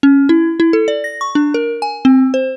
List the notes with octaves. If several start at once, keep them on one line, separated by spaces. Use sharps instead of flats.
C#4
E4
E4
A4
D5
A#6
C#6
D4
A#4
G#5
C4
C5